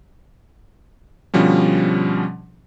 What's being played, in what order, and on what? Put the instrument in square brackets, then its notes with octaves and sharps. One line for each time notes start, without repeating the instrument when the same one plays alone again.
[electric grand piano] B2 D3 F3 G3 C#4